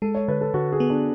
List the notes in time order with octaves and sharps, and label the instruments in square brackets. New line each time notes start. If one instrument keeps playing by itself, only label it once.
[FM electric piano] G#3 [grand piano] A4
[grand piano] C#5
[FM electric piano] D3 [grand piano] B4
[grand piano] A4
[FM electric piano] D3 [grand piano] F#4
[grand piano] G#4
[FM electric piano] B3
[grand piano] D4